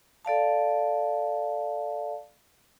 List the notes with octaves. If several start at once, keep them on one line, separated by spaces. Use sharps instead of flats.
A4 D5 F5 A5